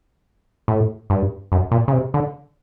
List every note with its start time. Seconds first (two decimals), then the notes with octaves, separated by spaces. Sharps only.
0.68 A2
1.10 G2
1.52 F#2
1.71 A#2
1.88 C#3
1.92 C3
2.14 D3